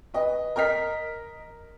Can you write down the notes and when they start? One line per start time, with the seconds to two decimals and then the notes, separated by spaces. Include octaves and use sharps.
0.14 B4 D#5
0.56 A#4 D#5 F6 B6